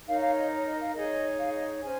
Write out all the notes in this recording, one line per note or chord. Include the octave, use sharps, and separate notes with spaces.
D#4 A#4 C#5 F5
F5
D#5
C#5
D#5
F5
D#4 G#4 C#5 D#5
F5
D#5
C#4 C5 G#5